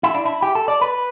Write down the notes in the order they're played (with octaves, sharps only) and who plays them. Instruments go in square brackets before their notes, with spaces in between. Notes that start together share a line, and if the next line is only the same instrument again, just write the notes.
[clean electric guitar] E4
D4
E4
G4
A4
D5
B4